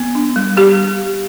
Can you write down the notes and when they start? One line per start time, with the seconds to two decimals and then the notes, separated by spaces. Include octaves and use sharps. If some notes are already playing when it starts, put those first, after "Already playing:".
Already playing: B3
0.15 D4
0.36 G3
0.57 G3 G4